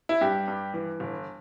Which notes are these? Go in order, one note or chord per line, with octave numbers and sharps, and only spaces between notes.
E4
G2 G4
G2
E3
G1